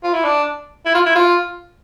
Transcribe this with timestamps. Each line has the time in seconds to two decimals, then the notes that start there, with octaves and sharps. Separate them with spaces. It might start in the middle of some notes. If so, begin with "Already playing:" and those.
0.03 F4
0.14 E4
0.24 D4
0.86 E4
0.95 F4
1.05 E4
1.15 F4